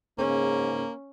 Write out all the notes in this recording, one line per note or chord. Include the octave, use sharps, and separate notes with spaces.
G#2 C#3 A#3 C#4